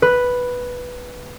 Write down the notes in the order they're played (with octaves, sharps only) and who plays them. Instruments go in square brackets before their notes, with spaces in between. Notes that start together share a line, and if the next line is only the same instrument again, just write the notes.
[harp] B4